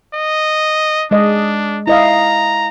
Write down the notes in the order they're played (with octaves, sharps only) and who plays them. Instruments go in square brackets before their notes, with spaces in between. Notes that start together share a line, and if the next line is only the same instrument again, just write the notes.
[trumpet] D#5
[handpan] G#3 D#5 [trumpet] D4
[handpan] E4 D#5 F5 [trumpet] A#5